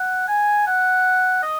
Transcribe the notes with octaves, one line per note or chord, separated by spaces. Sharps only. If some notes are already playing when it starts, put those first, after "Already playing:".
Already playing: F#5
G#5
F#5
D#5